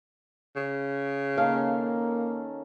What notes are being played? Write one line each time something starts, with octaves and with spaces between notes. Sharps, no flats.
C#3
D#3 A#3 C#4 A4 F5